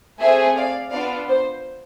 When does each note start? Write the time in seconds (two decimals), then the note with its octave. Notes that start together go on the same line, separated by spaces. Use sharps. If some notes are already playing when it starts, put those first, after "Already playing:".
0.20 A3 C4 G#4 E5 G#5
0.56 D5 F5
0.92 B3 D4 F4 D5 F5
1.28 C5